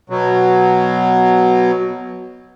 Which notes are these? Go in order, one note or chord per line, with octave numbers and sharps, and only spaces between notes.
B2 F#3